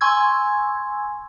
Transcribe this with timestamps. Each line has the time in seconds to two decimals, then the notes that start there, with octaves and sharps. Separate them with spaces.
0.01 G#5 C6 C#6 E6 G#6